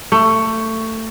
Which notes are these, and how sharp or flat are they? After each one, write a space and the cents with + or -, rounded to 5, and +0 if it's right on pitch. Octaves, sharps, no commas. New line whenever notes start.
A3 +20